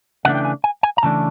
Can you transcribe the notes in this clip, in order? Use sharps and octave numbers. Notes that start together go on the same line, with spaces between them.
C#3 E3 A3 D4 F#5
G5
G#5
G#5
G#5
A#5
C#3 E3 A3 D4 A5